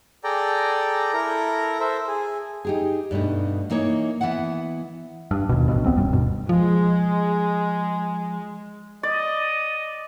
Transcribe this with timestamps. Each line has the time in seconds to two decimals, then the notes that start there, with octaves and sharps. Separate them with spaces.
0.24 G#4 A4 D5 G5 A#5
1.13 E4 A4 A#4 A#5
1.80 A4 C5 E5
2.07 G#4
2.65 D#4 G4 G#4
3.11 G2 B2 A3 D#4
3.70 E3 A#3 D#4 C#5
4.21 E3 B3 E5 F#5
5.31 G2
5.49 D#2 B2
5.68 A1 G2 B2
5.86 C#2 B3 C4
5.97 D1 C#2 F#2 G3
6.12 D2 G2 B2
6.49 F3 G#3
9.03 D5 D#5